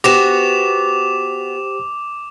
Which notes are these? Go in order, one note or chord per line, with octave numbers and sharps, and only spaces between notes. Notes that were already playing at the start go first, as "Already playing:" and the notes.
B3 F#4 G4 C5 D6 A#6 E7